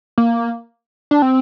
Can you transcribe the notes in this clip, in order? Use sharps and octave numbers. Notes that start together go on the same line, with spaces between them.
A#3
D4
C4